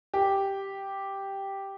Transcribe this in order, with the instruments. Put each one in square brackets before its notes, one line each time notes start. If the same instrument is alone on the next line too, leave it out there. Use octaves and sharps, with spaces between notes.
[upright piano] G4